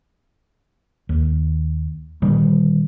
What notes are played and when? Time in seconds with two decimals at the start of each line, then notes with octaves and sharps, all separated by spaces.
1.09 D#2
2.22 A#2 D3 D#3 G3